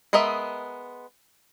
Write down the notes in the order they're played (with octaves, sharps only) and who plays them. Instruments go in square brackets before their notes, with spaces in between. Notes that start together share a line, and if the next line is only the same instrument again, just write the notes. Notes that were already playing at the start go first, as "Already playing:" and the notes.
[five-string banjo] G#3 B3 A#4 D#5 E5